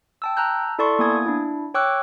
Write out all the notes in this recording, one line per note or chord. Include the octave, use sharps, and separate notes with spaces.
G5 A5 E6
A5 A#5 E6 F#6 G6
E4 A4 D5 A5 C6 C#6
A#3 B3 E4 G#5 D#6 G#6
D4 E4
C#5 G5 C#6 D6 E6 F#6